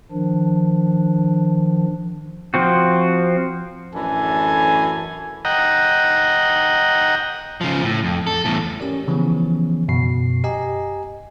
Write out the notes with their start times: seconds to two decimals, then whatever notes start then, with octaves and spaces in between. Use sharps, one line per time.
0.12 D#3 F3 D4
2.54 F3 C4 F#4
3.94 F#2 A2 E3 D4 A4 G#5
5.45 D#5 F#5 G5 A#5
7.61 C#3 F3
7.84 A2
8.04 F2
8.27 A4
8.45 E2 A2
8.80 C#4 G4 A#4 D5
9.08 C#3 E3 F3 B3 C#4
9.88 F#2 B2 C7
10.44 G4 D#5 G#5 A#5